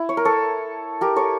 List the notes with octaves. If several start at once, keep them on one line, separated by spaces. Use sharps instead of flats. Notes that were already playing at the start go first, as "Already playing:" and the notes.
Already playing: E4
C#5
A#4
A4 C#5
G4 A#4
A4 C#5